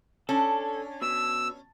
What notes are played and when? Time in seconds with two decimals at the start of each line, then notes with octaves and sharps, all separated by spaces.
0.29 C#4 D4 A4 A5
1.02 B2 E6